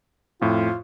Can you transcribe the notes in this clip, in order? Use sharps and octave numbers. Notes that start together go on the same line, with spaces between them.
F2 A2 F4